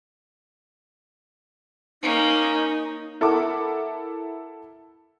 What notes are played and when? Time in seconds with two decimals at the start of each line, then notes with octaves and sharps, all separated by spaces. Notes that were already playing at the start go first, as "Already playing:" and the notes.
2.02 A#3 C#4 D#4
3.21 E4 A4 A#4 F#5 A5 D6